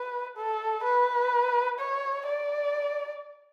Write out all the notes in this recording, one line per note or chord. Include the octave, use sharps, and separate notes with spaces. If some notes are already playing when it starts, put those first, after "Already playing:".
Already playing: B4
A4
B4
C#5
D5